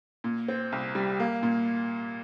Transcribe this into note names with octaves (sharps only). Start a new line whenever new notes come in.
A#2
C4
C2
G3
A#3
A#2